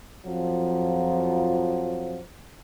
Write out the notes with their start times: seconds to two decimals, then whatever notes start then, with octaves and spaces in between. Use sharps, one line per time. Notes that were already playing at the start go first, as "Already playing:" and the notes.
0.25 F2 F3 F#3